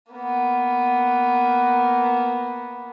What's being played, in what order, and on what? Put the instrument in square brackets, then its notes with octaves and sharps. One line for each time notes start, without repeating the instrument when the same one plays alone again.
[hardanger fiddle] A#3 B3